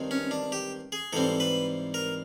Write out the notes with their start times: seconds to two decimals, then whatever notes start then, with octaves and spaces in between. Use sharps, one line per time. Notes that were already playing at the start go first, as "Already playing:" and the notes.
Already playing: G2 D#3 G#3 C4
0.11 C#4
0.31 D4
0.52 G4
0.92 G#4
1.13 G#2 E3 G3 C4 A4
1.40 B4
1.94 A#4